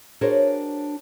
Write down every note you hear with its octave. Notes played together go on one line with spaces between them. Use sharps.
D4 F#4 G#4 A#4 C5 C#5